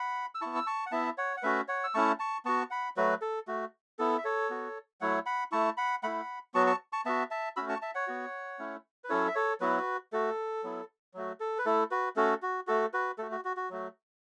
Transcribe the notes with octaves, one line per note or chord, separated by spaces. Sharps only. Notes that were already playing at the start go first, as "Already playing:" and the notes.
Already playing: F#5 B5
E6
B3 E4 A5 C#6
E6
A5 C#6
F#5
B3 E4 E5 A5
C#5 F#5
F#5
A3 C#4 F#4 B4 E5
C#5 F#5
E6
A3 C#4 E4 A5 C#6
A5 C#6
B3 F#4 A5 C#6
F#5 B5
F#3 A3 F#4 B4
A4
A3 F#4
B3 E4 A4
E5
A4 C#5
B3 F#4
F#3 A3 E4 C#5 F#5
F#5 B5
A3 E4 A5 C#6
F#5 B5
A3 E4 F#5 B5
F#3 B3 F#4 A5 C#6
A5 C#6
A5 C#6
B3 F#4 E5 A5
E5 A5
A3 C#4 F#4 B5 E6
A5 C#6
E5 A5
C#5 F#5
B3 F#4
A3 C#4 E4
B4
F#3 C#4 E4 A4 C#5
E5
A4 C#5
F#3 B3 E4 F#4 B4
A3 F#4 A4
F#3 B3 E4
F#3 A3 F#4
A4
B4
A3 E4 A4
F#4 B4
A3 C#4 F#4 A4
F#4
A3 F#4 A4
F#4 B4
A3 F#4 A4
F#4
F#4
F#4
F#3 A3 F#4